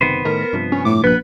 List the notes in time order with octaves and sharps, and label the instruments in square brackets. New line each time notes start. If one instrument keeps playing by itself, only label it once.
[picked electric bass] F#1 C3 D#3 [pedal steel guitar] B3 B4 C5
[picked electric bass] A2 D#3 A3 [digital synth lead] A#4
[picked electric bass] G2 C3 F3
[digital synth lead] C#4
[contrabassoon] A2 [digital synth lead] D6
[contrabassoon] A#1 [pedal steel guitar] B3 F#6 [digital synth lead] B4